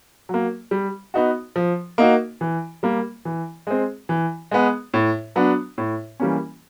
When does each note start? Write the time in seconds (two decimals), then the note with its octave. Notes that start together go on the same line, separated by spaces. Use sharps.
0.29 F#3 A#3
0.71 G3
1.14 B3 D#4 F#4
1.56 F3
1.98 A#3 D#4 F#4
2.41 E3
2.83 G3 A#3
3.25 E3
3.67 G#3 C4
4.09 E3
4.51 G#3 B3
4.94 A2
5.36 F#3 B3 D4
5.78 A2
6.20 E3 G3 A#3 C#4